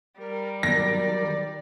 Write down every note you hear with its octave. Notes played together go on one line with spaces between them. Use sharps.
G3 A#4
D#3 F#3 A#4 D5 A#6